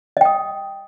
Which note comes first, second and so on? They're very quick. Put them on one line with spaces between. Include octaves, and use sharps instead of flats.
D#5 G5 D#6